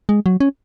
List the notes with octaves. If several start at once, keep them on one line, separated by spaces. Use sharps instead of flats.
G#3
F#3
C#4